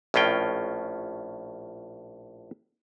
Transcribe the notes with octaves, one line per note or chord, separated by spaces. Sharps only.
A#1 A2 C#4 F4 G5